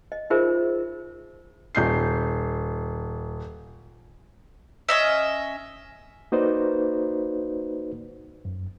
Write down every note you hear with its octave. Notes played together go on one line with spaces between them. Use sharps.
D#5
D#4 F4 G#4 A#4 C5 E5
D#1 G6 C7
C#4 D#5 E5
A#3 D#4 F#4 B4 C5 D5
F#2